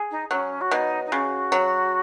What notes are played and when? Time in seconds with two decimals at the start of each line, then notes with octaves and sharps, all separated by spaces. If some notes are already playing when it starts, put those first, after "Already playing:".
Already playing: G#4
0.11 D#4
0.31 F#3 C#4
0.61 F#4
0.71 B2 D#4
1.06 D#4
1.12 C#3 F#4
1.52 F#3